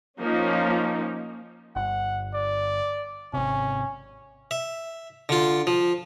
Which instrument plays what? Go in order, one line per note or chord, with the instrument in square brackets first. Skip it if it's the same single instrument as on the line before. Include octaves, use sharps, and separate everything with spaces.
[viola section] F3 A#3 C#4 D#4
[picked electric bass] G1 [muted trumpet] F#5
[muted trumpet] D5
[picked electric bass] G#1 C3 [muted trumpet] C#4
[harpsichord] E5
D3 F4
F3